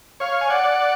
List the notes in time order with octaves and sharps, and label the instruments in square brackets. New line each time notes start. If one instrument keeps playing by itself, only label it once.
[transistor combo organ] C#5 F5
G#5
D5 F#5